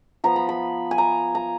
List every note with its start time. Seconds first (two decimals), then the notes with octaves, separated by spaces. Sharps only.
0.24 F3 B3 A#5
0.36 B5
0.49 B5
0.91 G#5
0.98 A#5
1.35 A#5